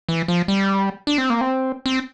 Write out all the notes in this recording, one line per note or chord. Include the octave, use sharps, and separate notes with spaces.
E3
F3
G3
D4
C4
A#3
C4
C4